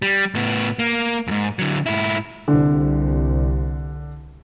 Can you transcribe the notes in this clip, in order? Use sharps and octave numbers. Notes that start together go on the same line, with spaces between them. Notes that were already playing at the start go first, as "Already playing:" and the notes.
G3
A2 B3
A#3
F2 G#2
D3 F#3
G#2 E4
C2 D3